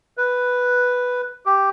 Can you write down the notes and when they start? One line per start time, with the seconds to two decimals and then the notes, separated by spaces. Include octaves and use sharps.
0.17 B4
1.46 G4